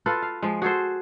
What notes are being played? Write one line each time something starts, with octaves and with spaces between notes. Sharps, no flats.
F4 A4 B4
F5
F3 G#3
F#4 G#4 A4 C5